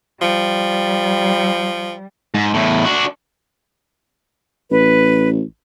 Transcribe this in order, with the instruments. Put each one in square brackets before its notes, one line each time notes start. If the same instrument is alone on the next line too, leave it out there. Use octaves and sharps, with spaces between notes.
[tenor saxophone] F3 [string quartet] G3
[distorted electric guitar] G#2
E2 A2
D4 F#4
[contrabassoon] A1 [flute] B4